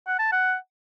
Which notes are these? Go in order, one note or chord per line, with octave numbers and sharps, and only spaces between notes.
F#5
A5
F#5